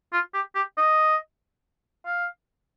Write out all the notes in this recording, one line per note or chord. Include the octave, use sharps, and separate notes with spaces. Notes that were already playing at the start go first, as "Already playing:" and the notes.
F4
G4
G4
D#5
F5